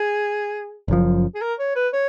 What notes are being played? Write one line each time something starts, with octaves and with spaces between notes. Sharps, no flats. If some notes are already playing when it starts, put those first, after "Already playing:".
Already playing: G#4
F#1 F#2 F3
G#4
A#4
C#5
B4
C#5